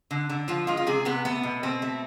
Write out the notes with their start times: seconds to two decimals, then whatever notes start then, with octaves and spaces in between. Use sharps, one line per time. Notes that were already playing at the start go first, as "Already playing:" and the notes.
0.11 D3
0.29 D3
0.48 F3 F4
0.67 G#3 F4
0.77 F4
0.87 C3 G#4
1.05 C3 B3
1.25 A3 B3
1.43 B2
1.63 B2 C4
1.82 A3